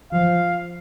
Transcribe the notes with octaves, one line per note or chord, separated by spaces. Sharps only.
F3 F5